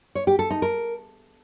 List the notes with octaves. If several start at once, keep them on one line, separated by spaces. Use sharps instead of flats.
C#5
G4
A4
D#4
A#4